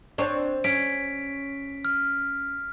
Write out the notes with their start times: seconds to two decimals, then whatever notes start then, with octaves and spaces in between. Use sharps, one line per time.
0.18 C4 D4 C#5
0.64 C#4 B6 D7
1.85 F6